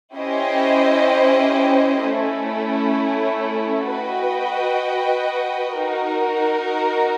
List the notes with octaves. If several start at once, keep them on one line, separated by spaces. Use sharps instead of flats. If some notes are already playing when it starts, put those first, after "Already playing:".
C#4 E4 G4 C5 D#5
A3 C#4 E4
F#4 B4 D#5 G5
D#4 F#4 A#4